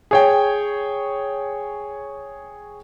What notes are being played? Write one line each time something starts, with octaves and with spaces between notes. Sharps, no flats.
G#4 C#5 G5